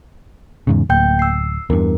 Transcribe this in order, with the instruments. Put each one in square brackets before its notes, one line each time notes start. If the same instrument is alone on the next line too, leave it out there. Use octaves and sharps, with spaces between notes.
[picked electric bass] E2 G#2 C#3
[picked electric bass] D1 [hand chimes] A#3 G5 G6
[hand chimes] E6 C7
[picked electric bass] E2 G2 [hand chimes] A#4